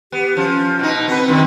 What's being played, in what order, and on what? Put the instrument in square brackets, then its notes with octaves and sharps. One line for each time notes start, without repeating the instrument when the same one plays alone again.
[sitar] B3 [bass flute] G4
[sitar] F3 [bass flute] C#4
[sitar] B2 D#4
[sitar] B3 B4 [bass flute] C4
[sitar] F#2 D#3